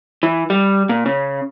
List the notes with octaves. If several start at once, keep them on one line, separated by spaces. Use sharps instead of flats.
E3
G3
A#2
C#3